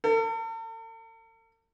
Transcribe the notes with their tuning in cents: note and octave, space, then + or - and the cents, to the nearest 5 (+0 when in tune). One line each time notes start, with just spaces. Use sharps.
A4 +45